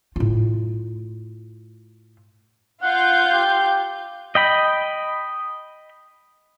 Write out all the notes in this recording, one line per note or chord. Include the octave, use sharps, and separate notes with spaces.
A2 F4
F4 F5 F#5 G6
G4
D#5 G5 B5